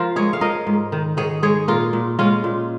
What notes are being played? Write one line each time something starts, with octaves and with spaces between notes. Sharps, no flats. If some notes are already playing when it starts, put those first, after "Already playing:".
Already playing: F3 F4 A#4
G#3 G#4 C#5
F5
F3 A#4 D#5
G#2
D#3
D#3 G#4 C#5
G#3 G#4 C#5
A#2 F4 A#4
A#2
G#3 C#4 F4
A#2